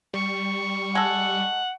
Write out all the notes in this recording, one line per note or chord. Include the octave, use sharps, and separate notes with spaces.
G3 C#6
G#3 A4 F#5